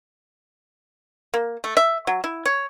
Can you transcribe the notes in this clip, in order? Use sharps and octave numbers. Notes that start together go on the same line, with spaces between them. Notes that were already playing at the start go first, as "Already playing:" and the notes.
A#3
A3
E5
F#3
E4
C#5